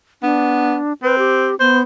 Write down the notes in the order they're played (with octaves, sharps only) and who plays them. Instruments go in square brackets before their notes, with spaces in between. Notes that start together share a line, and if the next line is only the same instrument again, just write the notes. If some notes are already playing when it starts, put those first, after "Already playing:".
[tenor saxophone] B3 [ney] D4
[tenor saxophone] C4 [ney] B4
[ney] G4
[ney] B3 [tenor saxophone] C5